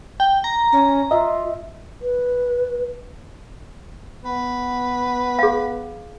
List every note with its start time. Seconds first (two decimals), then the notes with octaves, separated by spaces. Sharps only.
0.20 G5
0.44 A#5
0.72 C#4
1.11 F4 D#5 E5
2.02 B4
4.25 B3 B4
5.39 G#4 F5